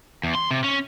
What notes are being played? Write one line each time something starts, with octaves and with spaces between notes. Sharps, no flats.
E2
C6
C3
C#4